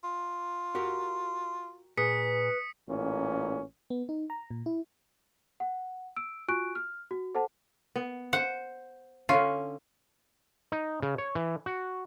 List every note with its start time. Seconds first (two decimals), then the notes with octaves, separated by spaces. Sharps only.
0.04 F4
0.75 F#4 G4 A#4
1.97 A#2 G#4 B4 D#6 B6 C#7
2.88 A1 A#2 C#4
3.90 B3
4.09 D#4
4.30 A#5
4.50 A#2
4.66 E4
5.60 F#5
6.16 E6 D7
6.48 F4 F#4 G#5 C#6 F#6 D7
6.75 F6
7.11 F#4
7.35 A4 C5 F#5 A5
7.96 B3
8.33 C5 F#5
9.29 D3 C#4 F4
10.72 D#4
11.02 C#3
11.18 C#5
11.35 E3
11.66 F#4